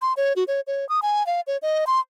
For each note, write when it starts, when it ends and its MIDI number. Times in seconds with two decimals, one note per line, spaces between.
0.02 0.13 84
0.17 0.33 73
0.36 0.44 66
0.48 0.61 73
0.67 0.88 73
0.89 1.00 87
1.02 1.25 80
1.26 1.41 77
1.47 1.57 73
1.62 1.85 75
1.87 2.00 84